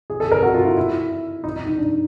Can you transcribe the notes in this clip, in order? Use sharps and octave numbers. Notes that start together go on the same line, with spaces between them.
G#4
A4
A#4
F#4
F4
E4
E4
D#4
D#4
D#4
D4